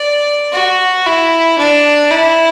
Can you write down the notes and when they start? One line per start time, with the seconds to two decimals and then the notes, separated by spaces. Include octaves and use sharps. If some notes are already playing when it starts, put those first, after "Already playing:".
Already playing: D5
0.52 F#4
1.06 E4
1.58 D4
2.11 E4